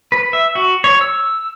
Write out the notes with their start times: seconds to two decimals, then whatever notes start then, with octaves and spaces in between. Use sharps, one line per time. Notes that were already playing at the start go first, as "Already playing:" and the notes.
0.12 B4
0.33 E5
0.55 F#4
0.84 C#5
1.01 E6